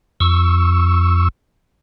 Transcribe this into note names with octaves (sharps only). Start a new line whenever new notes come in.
F2 C#6 E6